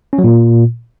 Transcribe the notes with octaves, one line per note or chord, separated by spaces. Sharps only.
C#4
F#3
A#2